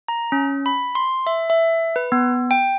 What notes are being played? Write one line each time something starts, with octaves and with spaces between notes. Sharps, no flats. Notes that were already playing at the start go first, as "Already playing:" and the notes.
A#5
C#4
B5
C6
E5
E5
B4
B3
G5